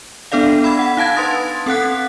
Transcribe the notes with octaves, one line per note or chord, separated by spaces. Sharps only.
B3 D4 A4 D5 F5
B5 E6 G#6
F#5
D#4 F5 A5 G#6
B4 C6 D#6 A6
C4 A4 F#5 F#6 B6